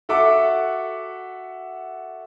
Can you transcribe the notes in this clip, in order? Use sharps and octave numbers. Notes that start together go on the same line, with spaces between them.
F#4 A4 E5 F#5 D6